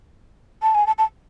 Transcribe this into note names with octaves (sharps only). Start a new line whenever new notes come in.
A5
G#5
A5
A5